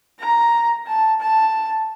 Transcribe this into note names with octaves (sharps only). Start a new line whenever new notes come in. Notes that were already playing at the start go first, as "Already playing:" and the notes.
A#5
A5
A5